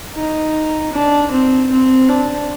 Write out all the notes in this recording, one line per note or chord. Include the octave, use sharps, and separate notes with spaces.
D#4
D4
C4
C4
D4